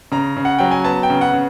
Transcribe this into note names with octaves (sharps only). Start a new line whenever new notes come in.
C#3 A#5
C#3
F#5
F#3 G5
G#5
B3 A5
G5
C#3
F#5
C#3